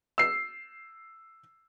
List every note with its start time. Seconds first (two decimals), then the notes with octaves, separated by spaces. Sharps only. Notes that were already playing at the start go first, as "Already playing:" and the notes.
0.18 E6 C7